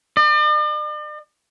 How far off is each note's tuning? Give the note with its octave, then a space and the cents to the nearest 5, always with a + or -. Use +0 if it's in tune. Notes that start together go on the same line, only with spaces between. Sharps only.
D5 +45